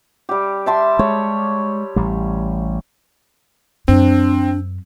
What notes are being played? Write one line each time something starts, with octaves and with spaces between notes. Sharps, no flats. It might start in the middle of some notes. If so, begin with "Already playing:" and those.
G3 G4
E5 A5 C6
G#3 C#5
A1 G3
F#2 C4 D4